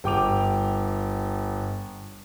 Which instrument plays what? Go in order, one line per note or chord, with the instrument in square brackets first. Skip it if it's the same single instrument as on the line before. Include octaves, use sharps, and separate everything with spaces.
[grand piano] G1 G5 D6 F7